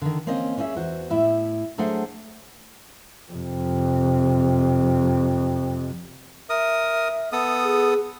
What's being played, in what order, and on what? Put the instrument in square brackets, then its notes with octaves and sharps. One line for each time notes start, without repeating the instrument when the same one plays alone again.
[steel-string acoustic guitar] D3 D#3
A#3 C4 C#4 D#5
G3 C#4 G#4 D#5 E5
E2 F#4 C5
A2 E4 E5
F#3 A3 D4 G#4 C5 F#5
[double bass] F2 C3
[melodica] A#4 D#6 [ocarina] E5
[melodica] B3 A4 D#6
[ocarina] G#4